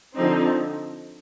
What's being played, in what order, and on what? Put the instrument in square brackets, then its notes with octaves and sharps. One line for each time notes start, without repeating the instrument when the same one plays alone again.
[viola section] D3 F3 C4 D#4